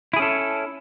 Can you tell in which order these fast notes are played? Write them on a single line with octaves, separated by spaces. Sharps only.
E4 G#4 C#4 A4